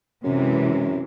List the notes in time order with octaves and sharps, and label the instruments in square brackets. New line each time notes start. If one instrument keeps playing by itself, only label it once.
[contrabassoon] F#2 [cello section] C3 E3 G#3